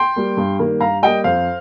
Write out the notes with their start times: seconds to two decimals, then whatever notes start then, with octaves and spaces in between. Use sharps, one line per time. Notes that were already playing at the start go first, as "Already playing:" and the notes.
Already playing: G5 C6
0.16 G3 A#3
0.37 G2
0.59 D#3 G3 A#3
0.80 G2 F5 A#5
1.03 G3 A#3 D#5 G5
1.24 F2 C5 F5